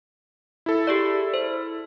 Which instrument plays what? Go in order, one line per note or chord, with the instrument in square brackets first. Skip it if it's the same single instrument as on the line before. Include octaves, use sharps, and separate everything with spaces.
[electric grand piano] E4 A4
[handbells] G4 G#4 D5
C5